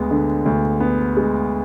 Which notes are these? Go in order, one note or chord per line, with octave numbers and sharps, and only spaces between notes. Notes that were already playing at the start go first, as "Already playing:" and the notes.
Already playing: D2 G#3 B3
D3
D2
B3
G#3